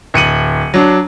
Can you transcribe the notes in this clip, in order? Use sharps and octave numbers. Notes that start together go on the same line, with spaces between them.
D1 C#7 D#7 F#7
F#3 D4